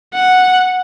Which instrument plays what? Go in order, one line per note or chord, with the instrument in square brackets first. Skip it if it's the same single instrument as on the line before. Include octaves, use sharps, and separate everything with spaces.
[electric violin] F#5